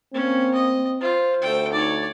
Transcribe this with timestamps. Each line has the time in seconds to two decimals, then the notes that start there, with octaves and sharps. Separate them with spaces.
0.14 A#3 C4 C#4
0.54 D#5
1.01 F4 C5
1.42 D2 A3 G5
1.72 D#4 C#5 D5